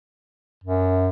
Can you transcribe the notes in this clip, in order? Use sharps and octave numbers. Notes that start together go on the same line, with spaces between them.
F#2